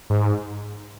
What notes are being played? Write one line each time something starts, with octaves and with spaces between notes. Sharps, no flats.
G#2